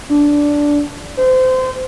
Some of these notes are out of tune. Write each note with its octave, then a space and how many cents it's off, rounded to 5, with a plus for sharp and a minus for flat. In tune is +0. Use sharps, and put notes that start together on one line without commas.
D4 -10
C5 -25